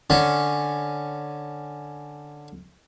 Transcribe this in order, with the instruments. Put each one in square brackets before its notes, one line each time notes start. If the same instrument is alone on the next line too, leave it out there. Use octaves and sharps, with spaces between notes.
[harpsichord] D3 C#4